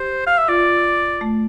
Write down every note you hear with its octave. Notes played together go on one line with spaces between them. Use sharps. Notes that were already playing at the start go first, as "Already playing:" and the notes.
Already playing: G4 C5
F5
E5
F4 D5
A3